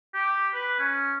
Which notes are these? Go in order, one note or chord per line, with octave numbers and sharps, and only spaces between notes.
G4
B4
C#4